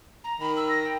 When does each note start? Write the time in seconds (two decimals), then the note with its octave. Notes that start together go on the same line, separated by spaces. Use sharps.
0.24 A#5
0.40 D#3 B5
0.57 E6
0.69 A#6
0.84 G5